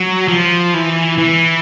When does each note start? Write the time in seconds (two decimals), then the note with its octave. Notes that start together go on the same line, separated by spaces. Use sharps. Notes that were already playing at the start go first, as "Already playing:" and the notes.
Already playing: F#3
0.28 F3
0.74 E3
1.18 E3